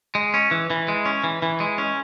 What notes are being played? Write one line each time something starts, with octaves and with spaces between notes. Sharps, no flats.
G#3
C#4
E3
E3
G#3
C#4
E3
E3
G#3
C#4